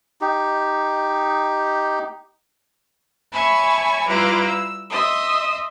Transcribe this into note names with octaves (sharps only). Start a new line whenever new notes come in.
D#4 G4
C#5 E5 G#5 A5 B5 C#6
G3 E4 F4 B4 A#5 D6
E6
D#5 E5 C6 D#6